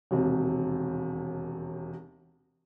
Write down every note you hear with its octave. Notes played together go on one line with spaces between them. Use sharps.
E1 D#2 C3